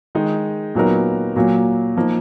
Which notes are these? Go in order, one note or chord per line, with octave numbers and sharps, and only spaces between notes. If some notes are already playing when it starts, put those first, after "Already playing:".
D#3 G#3 D#4
A#2 F#3 B3 D#4 A#4
A#2 F#3 A#3
F3 A#3 D#4